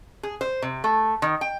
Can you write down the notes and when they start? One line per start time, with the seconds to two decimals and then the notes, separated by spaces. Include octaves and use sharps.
0.23 G#4
0.41 C5
0.62 C3
0.84 A3
1.22 D#3
1.41 G5